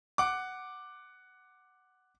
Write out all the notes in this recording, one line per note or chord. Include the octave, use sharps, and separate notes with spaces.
F#5 D6